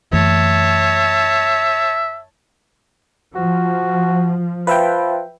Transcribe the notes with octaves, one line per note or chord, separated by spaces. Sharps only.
F#2 E3 A3 C#5 E5 A5
F3 F#4
F3 B4 E5 G5